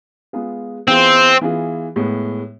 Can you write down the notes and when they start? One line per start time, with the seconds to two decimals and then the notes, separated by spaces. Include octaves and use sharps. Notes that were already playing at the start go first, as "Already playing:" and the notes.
0.33 G#3 B3 F4 G#4
0.87 E3 B3 C4 F4 G#4
1.41 E3 B3 F4 G#4
1.96 A2 G#3 B3